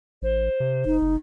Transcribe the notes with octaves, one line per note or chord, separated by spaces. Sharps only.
A1 C5
C3
F#1 D#4
F#1